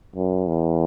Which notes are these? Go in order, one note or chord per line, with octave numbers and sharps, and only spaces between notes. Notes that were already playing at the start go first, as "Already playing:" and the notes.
F#2
E2